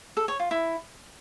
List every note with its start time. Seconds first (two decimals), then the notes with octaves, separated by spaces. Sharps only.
0.17 A4
0.28 C#5
0.40 F4
0.51 E4